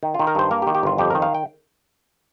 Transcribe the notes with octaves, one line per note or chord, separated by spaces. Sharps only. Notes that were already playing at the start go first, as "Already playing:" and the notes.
D#3
D#3 F4
A#4
G2 C5
A#3 A#4
G4
D#3
G4
G1 F4
F2 G4
D#3 A#4
F5
G5